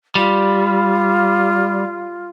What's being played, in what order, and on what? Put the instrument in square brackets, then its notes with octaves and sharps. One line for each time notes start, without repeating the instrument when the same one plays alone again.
[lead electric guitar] G3 [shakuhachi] F4